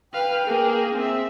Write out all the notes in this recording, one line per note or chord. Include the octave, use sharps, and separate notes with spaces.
B4 F5 G5
A#3 G#4
C4 E5